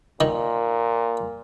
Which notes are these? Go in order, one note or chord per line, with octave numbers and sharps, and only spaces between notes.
A#2 D#3